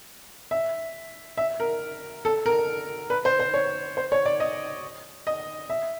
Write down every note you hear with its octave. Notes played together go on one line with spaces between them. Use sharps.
E5
E5
A#4
A4
A#4
B4
C5
C5
C#5
C5
C#5
D5
D#5
D#5
E5